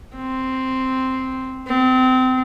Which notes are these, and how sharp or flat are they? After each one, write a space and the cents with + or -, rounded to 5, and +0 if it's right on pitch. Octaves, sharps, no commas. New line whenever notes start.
C4 +0
C4 -30